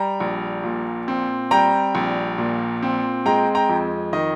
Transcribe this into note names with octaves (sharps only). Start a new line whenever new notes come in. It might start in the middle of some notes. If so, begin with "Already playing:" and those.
Already playing: G3 G5 A#5
A#1
A#2
C4
G3 G5 A#5
A#1
A#2
C4
G#3 G5 A#5
G5 A#5
F2
D#3 D#5